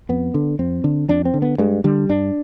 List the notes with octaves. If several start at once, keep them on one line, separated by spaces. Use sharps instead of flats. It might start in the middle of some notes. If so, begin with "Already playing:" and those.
F2 B3
D3
F2 C4
D3
F2 D4
C4
D3
B3
G2 G#3
D3 G3
G2 D4